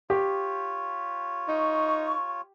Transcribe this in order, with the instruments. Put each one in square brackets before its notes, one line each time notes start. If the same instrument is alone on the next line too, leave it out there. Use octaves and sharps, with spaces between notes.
[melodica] F4 C#5 [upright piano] G4
[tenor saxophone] D#4 [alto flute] C#6